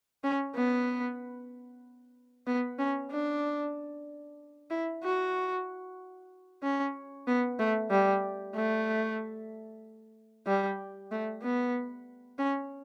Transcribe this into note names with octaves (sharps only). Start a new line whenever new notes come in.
C#4
B3
B3
C#4
D4
E4
F#4
C#4
B3
A3
G3
A3
G3
A3
B3
C#4